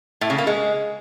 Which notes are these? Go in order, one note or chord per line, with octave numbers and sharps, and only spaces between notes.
A2
C#3
A#3
G#3